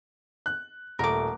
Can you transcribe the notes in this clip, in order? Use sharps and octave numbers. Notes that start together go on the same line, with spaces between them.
F#6
D#1 A3 A#4 D6